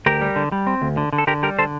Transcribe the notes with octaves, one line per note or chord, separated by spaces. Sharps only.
D2 G4 A#4
G3
D3
G3
C4
D2
D3
D3
A4
D3 G4 A#4
G3 G4 A#4
D3 A4 C5